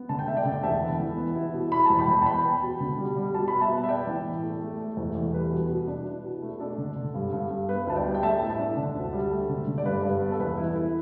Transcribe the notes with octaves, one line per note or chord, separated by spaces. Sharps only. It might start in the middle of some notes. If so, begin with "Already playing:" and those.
Already playing: B3
D3 A5
G5
A3 E5
D5 G5
D3
G5
E2 E5 A5
B3
E3
B3
E4
B2
E4 B5
E2 A5
G5 B5
E2
A5
B3 G5 B5
B3
B2
D3
G3
G3
B2 A5
B5
B3
E5 A5
B3
E5
B3 D5 G5
E3
A2
A3
A3
A3
E2
E2
G3 B4
B2
B2
D4
E4
B2
A3
D4 A4
D3
D3
G2
G2
G2
B3 B4
D2 A5
D5 G5
G3
G5
A3 E5 A5
A2
E5 A5
D4
D3
D2
G3
A3
D3
D3
D5
G2 B4
G2
B3
A4
E2 B4
E4
E4